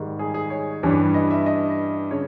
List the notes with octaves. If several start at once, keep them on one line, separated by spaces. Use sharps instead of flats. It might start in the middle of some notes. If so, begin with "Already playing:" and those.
Already playing: G#2 D#3 G3
G#4
G#4
C#5
G2 E3 G3 C#4
D#5
E5
D#5
C#3 C#5